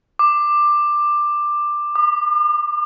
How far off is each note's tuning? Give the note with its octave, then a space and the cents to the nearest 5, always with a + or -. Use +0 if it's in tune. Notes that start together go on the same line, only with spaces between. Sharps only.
D6 +15
D6 +45